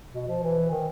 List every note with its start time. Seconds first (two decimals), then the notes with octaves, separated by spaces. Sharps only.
0.13 B2
0.28 F3
0.43 E3
0.71 D#3